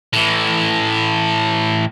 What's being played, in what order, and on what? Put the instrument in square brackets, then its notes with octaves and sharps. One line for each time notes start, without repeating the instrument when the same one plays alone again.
[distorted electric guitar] A2 E3